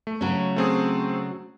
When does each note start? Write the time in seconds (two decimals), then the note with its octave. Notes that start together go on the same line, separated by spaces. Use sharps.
0.07 A3
0.21 C#3 F#3 C#4
0.56 A3 C4 G#4